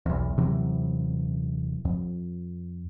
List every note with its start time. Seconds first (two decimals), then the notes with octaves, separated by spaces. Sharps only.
0.06 B1 E2
0.37 D#1 C3 E3 F#3
1.85 F2